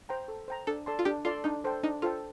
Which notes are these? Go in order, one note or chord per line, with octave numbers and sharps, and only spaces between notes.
C5 G5 A#5
A4
C5 G5 A#5
D4 A4
A4 D5 A5 C6
F4
D4 G4
F4 A4 D5 A5 C6
D4 D#4
A4 C5 G5
D4 D#4
F4 A4 C5 G5